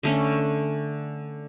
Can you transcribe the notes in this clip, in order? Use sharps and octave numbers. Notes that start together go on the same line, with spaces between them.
D3 A3 C#4